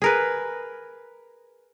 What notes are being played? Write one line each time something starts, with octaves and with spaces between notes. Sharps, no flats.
G#4 A#4 B4